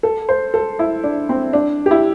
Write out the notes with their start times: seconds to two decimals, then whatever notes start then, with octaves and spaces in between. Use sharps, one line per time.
0.03 A4
0.29 C5
0.54 A4
0.79 E4
1.04 D4
1.29 C4
1.53 D4
1.86 G4
1.91 E4